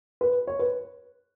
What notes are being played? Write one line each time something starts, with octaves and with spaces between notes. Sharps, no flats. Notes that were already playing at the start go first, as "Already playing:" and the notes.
B4
C#5
B4